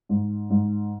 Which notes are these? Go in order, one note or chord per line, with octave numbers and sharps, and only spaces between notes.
G#2
G#2